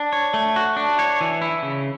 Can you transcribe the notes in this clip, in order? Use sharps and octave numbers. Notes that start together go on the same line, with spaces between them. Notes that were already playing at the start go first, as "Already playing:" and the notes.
Already playing: D4
C#5
A3
F#4
D4
C#5
E3
E4
C#3